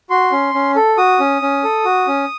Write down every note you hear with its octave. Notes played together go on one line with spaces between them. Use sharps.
F#4 C6
C#4
C#4
A4
F#4 D#6
C#4
C#4
A4
F#4
C#4